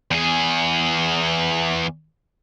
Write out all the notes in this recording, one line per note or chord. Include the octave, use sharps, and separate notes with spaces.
E2 G#4